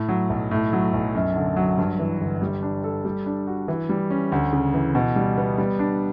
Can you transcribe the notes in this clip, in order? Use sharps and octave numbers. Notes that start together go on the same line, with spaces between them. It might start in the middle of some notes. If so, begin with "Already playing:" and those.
Already playing: A2
F#3
B1
A2
F#3
B1
F#2
D3
F#3
G2
E3
G1
G3
D4
A4
G3
D4
F#4
E3
G3
C#4
D2
C#3
E3
B2
G3
B3
G3
D4